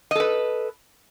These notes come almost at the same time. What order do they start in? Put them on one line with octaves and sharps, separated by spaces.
D#5 A4 B4